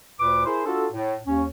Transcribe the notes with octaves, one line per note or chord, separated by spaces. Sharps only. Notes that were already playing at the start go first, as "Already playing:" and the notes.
D2 A#2 B4 D6
E4 G#4 A#4 C5
D4 F4 F#4 A4
A2
D#2 C#4